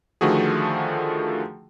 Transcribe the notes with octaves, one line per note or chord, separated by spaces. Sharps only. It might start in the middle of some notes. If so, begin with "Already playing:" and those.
D3 D#3 F3 A3 F#4 G#4